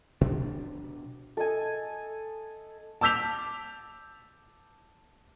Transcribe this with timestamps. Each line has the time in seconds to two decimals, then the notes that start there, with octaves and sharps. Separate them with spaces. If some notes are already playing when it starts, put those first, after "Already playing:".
0.21 B2 D4
1.37 A4 D#5 G#5
3.01 A5 D6 E6 G6 B6 F7